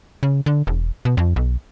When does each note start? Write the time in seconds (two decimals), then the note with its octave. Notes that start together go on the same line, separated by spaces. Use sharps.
0.23 C#3
0.46 D3
0.67 E1
1.05 B2
1.17 F2
1.36 B1